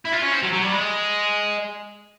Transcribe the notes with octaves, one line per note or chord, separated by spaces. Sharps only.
E4
F4
C#4
C4
F#3
F#3
G3
G#3